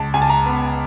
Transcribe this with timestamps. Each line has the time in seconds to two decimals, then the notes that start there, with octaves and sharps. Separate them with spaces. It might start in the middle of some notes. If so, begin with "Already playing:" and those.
Already playing: C#2 A5
0.14 C#2 G#5
0.22 A5
0.29 A#5
0.46 B3